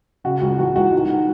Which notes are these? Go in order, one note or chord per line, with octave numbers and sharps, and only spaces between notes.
C#3 F#4
C#2 F#4
E3 F#4
C#2 F#4
D#3